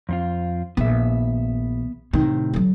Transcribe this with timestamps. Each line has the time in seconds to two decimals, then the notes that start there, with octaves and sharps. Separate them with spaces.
0.09 F2 C4 F4
0.77 A#1 D#3 B3 E5
2.13 A2 C3 D#3 C4
2.53 D3 F#3